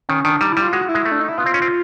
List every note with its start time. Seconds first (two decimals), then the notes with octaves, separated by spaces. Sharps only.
0.09 D#3 C#4
0.24 D#3 D4
0.41 G3 D#4
0.52 E4
0.57 G3
0.62 F4
0.73 G#3 F#4
0.89 E4
0.95 G#3
1.05 A3
1.12 D4
1.21 D#4
1.29 E4
1.38 B3 F4
1.46 C4
1.54 C#4
1.62 C4